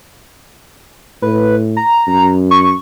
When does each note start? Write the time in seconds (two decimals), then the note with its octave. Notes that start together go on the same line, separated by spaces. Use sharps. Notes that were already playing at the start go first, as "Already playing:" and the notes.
1.22 A2 B4
1.77 A#5
2.07 F#2
2.51 C#6